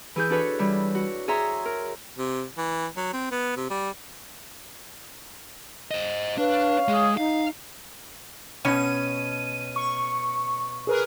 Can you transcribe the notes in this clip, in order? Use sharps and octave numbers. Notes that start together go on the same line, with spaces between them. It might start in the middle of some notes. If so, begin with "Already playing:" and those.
E3 G#4 G6
D4 F#4 A4 B4 C#5
E3 G3 E5
F#4
G#4 C#5 E5 A#5 C6
A#4
C3
E3
F#3
C4
B3
C3
G3
C5 D#5
D4 B4 C#5 F5
G#3 G#4
D#4 F5
B2 C#4 D#7
C#6
G#4 A#4 B4